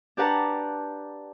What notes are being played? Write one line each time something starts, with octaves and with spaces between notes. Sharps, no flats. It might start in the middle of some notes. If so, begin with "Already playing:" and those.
D4 G4 B4 F#5 A5 A#5